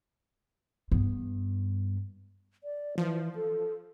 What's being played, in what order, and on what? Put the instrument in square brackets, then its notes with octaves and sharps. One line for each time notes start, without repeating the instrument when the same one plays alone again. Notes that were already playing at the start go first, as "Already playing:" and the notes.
[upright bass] G2 B3
[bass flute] D5
[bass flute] E3 [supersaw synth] F3
[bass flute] A4